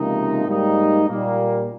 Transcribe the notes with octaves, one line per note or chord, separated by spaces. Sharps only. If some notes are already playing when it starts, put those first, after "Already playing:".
Already playing: C#2 C3 F3 A#3 D#4
G#2 G3 A#3 D#4
A#2 G3 A#3